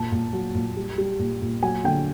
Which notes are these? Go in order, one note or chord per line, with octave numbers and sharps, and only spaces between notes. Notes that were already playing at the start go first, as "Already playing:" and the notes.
Already playing: A#2 A5
A#2
F#3
A#2
G3
G3
A#2
A#2
F#3 G#5
D3 G5